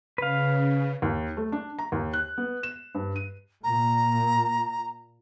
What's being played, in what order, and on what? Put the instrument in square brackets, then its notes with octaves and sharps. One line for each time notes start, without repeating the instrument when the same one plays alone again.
[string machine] C#3 [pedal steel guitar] B4 F5
[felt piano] D#2
A3
D4
A#5
D#2
F#6
B3
E7
G2
D#7
[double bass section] A#2 [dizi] A#5